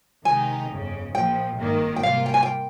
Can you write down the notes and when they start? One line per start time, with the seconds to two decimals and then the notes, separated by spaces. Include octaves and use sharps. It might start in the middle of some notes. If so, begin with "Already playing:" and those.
0.25 C3 D#3 G#3 D#4 G4 G#5
0.70 G1 F2 C#3
1.14 A#1 A#2 F3 G5
1.59 G#1 G2 D#3 A#3
1.96 G5
2.03 C3 G3 A#3 F4 F5
2.26 G5
2.34 G#5
2.43 G5